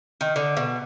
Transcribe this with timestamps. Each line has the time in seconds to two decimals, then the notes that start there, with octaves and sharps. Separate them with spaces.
0.21 D#3
0.36 D3
0.57 B2